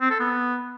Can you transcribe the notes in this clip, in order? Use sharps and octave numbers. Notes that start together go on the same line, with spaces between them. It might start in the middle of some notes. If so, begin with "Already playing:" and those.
C4
A4
B3